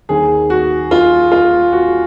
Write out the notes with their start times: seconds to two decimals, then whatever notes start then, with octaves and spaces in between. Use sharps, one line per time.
0.09 D#2 D#3 G#4
0.50 F#4
0.91 F4
1.32 F4
1.72 F#4